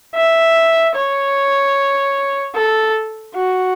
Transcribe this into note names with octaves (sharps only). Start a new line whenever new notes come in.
E5
C#5
A4
F#4